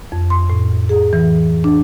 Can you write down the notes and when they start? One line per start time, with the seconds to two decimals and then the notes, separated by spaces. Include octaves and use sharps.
0.12 F2
0.30 C6
0.50 A2
0.89 G#4
1.13 E3
1.64 D4